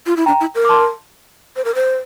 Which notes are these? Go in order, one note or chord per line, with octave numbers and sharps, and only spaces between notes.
F4
E4
D4 G5 A#5
E4
A#4
D6
A5 C6
C5
A#4
C5